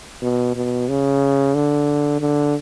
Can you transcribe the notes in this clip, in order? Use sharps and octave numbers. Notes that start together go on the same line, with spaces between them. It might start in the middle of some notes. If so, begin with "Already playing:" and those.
B2
B2
C#3
D3
D3